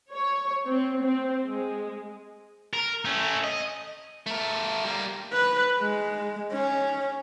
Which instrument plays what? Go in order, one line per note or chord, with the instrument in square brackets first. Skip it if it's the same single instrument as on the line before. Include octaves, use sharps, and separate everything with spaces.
[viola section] C#5
C4
C4
G#3
[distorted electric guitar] A#4
A3 C#4
D#5
A3 A#4
G3 A#3
[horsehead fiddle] B4
G#3
C#4